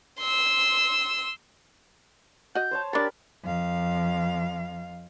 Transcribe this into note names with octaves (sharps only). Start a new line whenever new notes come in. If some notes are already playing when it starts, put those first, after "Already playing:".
C6 E6
F#4 D#5 G6
C5 C#5 A5
D4 G4 A#4 C#5 B5 A6
F2 F5